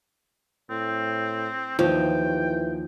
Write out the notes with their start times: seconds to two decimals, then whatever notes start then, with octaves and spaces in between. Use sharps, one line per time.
0.70 A2 C4
1.79 D#2 E3 F3 G5